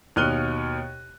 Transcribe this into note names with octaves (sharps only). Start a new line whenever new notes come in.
D#2 B2 F6 F#6 D#7 G7